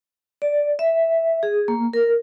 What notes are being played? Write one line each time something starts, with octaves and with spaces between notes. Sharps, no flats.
D5
E5
G#4
A#3
A#4